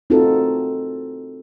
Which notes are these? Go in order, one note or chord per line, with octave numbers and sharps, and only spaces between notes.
C4 D#4 F4 F#4 A4 A#4